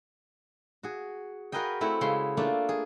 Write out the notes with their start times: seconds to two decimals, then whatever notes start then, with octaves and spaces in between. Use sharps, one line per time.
0.83 F#4 G#4
1.52 F#4 G#4 A#4 B4 D#5 G5
1.81 A3 C4 E4 F#5
2.01 C#3 G#3 B5 C6
2.37 A3 A#3 D4 F4
2.69 G#4